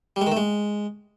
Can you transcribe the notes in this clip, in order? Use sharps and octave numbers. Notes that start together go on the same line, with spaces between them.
G3
G#3
D#3
A3
G#3